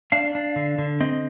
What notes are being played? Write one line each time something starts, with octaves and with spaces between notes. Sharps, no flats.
D4 F5
D4
D3
D3
C4 D#5